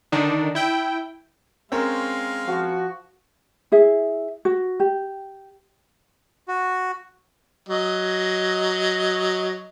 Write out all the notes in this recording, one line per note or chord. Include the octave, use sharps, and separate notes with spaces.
D3 D#3 D4 D#4
E4 G5
G#3 C4 C#4 A#4 F5
F3 F#4
E4 G#4 E5
F#4
G4
F#4
F#3 D#5